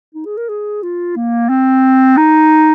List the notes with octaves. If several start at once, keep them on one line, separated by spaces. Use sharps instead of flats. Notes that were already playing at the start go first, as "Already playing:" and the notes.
D#4
G#4
A#4
G#4
F4
A#3
C4
D#4